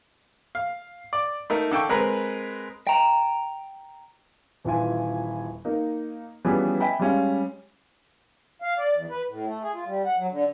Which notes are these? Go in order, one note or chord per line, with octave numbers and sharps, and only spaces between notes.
F5
D5
A3 D#4 A#4
D3 A4 G5 C#6
G#3 C4 A#4 B4 A#5 B5
G5 A#5
D#1 E3 E4 F4 G#5
A#3 D#4
E3 F3 G3 B3 C#4 G#4
D#5 E5 G5 G#5 B5
G3 G#3 C#4 F5
F5
D5
E2
B4
A2
A3
G#4
F4
G3
F#5
F#3
D3